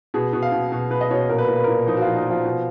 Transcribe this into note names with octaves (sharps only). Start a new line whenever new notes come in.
B2 G#4
B2
F5
B2
B2
B2 B4
D#5
B2 C#5
A#2 A#4
B4
A#2 A#4
B4
A#2 A#4
F3 D#4
F#4
F3 F4
D#4
F3 F4
B2